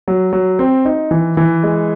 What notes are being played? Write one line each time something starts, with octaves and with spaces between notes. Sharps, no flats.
F#3
F#3
C4
D#4
E3
E3
G#3